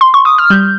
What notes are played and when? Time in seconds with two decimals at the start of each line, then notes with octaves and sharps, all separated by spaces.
0.01 C6
0.14 C#6
0.25 D#6
0.38 F6
0.50 G3 G6